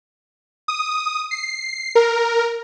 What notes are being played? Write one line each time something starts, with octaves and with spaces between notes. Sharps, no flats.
D#6
C7
A#4